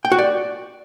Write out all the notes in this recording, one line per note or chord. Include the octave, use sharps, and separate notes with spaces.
G5
F#4
D5